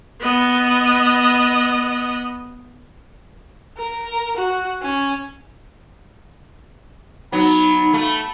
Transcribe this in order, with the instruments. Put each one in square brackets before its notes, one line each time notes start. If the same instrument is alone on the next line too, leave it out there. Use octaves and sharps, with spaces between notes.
[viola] B3 D#5
[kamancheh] A#4
F#4
C#4
[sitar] F#3 B3 [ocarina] D#4 [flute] B5
[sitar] A3